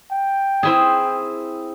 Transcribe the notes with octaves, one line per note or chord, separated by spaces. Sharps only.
G5
C4 E4 G#4